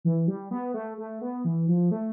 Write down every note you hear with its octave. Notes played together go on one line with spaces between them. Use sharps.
E3
G3
B3
A3
A3
B3
E3
F3
A3